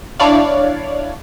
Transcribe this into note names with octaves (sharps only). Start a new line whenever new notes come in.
D4 E4 C#5 D5 F5